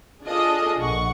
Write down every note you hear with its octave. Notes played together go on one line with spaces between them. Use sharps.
D4 F4 G#4 A4 D#5
A#1 F#5 C#6